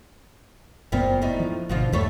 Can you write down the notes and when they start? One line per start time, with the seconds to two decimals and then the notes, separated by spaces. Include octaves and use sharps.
0.92 F#1 F#2 A#2 F3 G3 B3
1.22 A2 D4 D#4
1.40 F3
1.69 G#1 B2 D3 F3 F4
1.93 E2 G2 F3 G3 A3 C#5